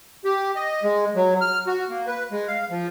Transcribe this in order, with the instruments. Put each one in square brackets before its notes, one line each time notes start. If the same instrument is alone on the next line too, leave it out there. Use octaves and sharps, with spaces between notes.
[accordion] G4
D#5
G#3
F#3
F6
F#4
A#3
B4
G#3
F5
F3